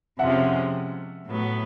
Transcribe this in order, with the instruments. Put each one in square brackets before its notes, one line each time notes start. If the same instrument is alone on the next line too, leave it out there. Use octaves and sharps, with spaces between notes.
[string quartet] F2 C3 F3 G#3 C#4 [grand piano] E5 F#5
[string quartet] A2 F#3 B3